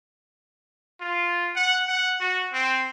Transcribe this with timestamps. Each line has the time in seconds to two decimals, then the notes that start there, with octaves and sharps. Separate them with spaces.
1.01 F4
1.56 F#5
1.88 F#5
2.20 F#4
2.53 C4